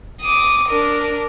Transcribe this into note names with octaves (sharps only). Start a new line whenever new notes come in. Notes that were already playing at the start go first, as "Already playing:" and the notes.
D6 D#6
D4 A#4